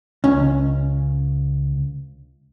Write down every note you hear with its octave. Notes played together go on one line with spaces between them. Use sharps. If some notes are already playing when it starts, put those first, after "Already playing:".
C#2 C#4